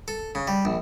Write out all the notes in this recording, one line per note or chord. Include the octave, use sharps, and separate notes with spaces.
A4
C#3
G3
A#1